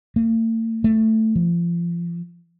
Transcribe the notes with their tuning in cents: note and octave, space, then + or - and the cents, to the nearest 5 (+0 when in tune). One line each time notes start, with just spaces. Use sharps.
A3 +45
A3 +5
F3 -30